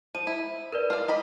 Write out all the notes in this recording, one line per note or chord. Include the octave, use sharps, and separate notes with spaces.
F3 D#7
E4
A#4 B4 D5
F4 D5 F6
D#5 A#5 B5